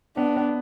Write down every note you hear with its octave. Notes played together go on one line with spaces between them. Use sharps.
B3 D4
B3